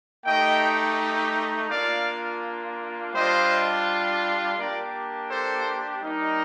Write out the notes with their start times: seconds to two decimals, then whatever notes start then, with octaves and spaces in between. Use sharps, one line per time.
0.25 A3 D#4 G4 D#5 G5
1.70 A#3 D4 F4 D5 F5
3.14 G3 D4 F4 C5 D#5
4.58 A#3 D4 G4 A#4 D5
5.31 A4 C5
6.03 G3 A#3 D#4